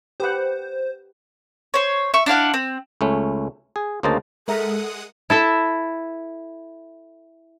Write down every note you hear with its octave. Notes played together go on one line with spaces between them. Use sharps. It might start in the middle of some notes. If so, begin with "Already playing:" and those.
G4 B4 C5 F#5
C5 C#5
E5 C#6
D4 E4 F5 F#5
C4
C#2 A3 C#4
G#4
D2 C#3 A#3 C5 D#5 A5
G#3 A4 A#4 E5 F#5 A#5 D#6
E4 A4 E5